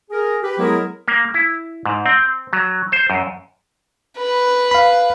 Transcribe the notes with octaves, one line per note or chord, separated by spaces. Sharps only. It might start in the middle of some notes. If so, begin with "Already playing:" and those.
G#4 A#4
G4 B4
F#3 G#3 B3 E4 G#4 A#4
A#3
E4
G#2
C4
F#3
C5
F#2
B4
F5 B5